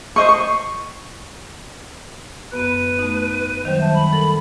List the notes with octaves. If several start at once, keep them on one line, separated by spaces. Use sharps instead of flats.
C5 D#5 C#6
C#6
F#2 B3 B4 F#6
A3 D#4
D#3 F#3 G3 C5
E5 A5
B5
A4 A#4